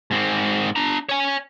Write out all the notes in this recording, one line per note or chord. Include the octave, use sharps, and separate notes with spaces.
G#2 C4
D4 A#5
C#5 G#5